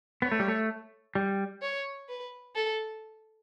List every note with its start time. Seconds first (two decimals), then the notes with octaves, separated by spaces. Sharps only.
0.22 B3 C#5
0.32 A3
0.40 G3
0.48 A3
1.15 G3
1.62 C#5
2.09 B4
2.55 A4